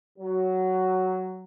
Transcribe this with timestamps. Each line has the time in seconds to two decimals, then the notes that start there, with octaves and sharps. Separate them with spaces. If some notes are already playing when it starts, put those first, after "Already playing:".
0.18 F#3